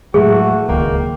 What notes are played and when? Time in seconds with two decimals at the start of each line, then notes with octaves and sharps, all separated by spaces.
0.14 A2 E3 F#3 G#3 A3 F#4 G#4
0.69 D1 C#2 D#3 G#3 A#3 G5